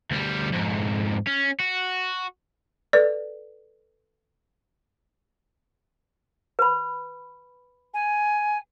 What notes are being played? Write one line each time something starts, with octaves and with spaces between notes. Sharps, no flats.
D2 G3
F2 G#2
C#4
F#4
A4 B4 D5
B4 B5
G#5